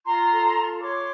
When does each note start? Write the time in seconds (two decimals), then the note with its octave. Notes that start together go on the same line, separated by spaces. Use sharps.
0.05 F4 A#5 C6
0.31 A4
0.57 F4
0.81 C#5 C6 D6